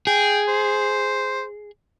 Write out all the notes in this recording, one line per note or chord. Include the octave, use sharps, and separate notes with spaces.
G#4 G5
C5